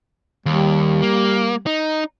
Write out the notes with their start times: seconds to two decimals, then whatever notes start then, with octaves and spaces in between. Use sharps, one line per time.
0.46 D#2 G3
1.02 A#3
1.66 D#4